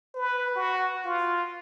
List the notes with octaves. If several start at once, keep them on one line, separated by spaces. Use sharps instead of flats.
B4
F#4
F4